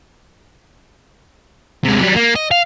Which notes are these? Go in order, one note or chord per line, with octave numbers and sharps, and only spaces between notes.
C3 G#3
F#3 G3
A#3
D#5
F5